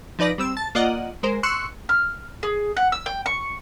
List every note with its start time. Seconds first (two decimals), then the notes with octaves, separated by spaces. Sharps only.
0.19 F3 D#4 B4 D5 A#6
0.38 G3 C4 E6
0.57 A5 A6
0.75 A#3 F4 D5 D#5 F#5
1.23 G#3 A#4 C5
1.43 C6 C#6 E6 F#6 C#7
1.89 F6
2.43 G#4
2.77 F#5
2.92 E6
3.06 G5
3.26 C#6